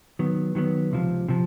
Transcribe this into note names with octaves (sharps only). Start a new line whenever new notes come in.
D#3 F#3 B3
D#3 F#3 B3
C#2 C3 F3
C3 F3